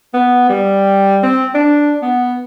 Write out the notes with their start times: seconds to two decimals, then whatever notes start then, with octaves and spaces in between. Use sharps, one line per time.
0.14 B3
0.50 G3
1.24 C4
1.55 D4
2.03 B3